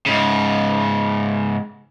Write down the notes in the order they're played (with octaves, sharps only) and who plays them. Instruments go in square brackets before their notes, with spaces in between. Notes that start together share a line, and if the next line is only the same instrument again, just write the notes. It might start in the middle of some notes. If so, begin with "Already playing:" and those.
[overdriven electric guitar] G#2 C#3